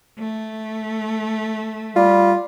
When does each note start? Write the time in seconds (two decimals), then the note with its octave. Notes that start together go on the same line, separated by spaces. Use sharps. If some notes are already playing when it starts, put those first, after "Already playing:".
0.19 A3
1.96 G3 F4